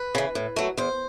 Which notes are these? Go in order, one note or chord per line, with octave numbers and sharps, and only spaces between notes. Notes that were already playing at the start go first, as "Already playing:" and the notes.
Already playing: B4
C#3 E3
A2
F#3 A3
E2 C5